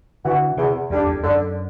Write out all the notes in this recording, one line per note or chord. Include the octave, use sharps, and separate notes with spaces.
D3 E3 B3 F#4
E2 C3
E2 D3 G3 D4
E2
F#2 D3